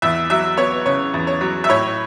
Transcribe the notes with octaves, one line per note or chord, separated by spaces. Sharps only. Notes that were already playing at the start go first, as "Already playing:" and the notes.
E2 E5
F#3 E5
B3 C#5
C#3 C#5
E2
C#5
F#3
E5
A2 C#5